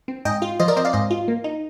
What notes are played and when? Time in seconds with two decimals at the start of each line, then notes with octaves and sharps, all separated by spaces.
0.08 C4
0.25 G#2 D#5 G5
0.42 F4
0.60 F3 C5 D#5
0.68 A#4 D5
0.77 C4 C5 D#5
0.85 D5 F5
0.93 G#2 C5 D#5
1.11 F4
1.28 A#3
1.44 D#4